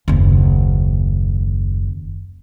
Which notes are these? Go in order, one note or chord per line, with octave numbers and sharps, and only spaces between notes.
F#1 D#2